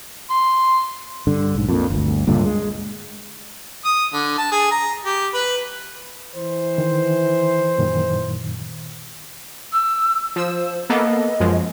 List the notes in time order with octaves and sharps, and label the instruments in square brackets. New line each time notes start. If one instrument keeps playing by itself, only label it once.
[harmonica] C6
[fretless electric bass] G2 D3
B1 G#2
F2 A#2
G1 D2
C#2 G2 A#2 D3
G#3
[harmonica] D#6
D3
A5
G#4
A#5
G4
B4
[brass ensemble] E3 C5
[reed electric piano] D#3
F#2 A#2 D#3
[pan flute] E6
[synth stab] F3 E6 [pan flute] C5
[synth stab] A#3 B3 A4 [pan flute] D#5
[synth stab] F#2 F3 G#3